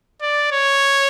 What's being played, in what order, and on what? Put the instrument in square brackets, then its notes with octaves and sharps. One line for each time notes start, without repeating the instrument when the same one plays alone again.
[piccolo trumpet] D5
C#5